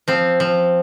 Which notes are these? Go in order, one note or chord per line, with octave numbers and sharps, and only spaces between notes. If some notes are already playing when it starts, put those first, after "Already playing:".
F3 C4
F3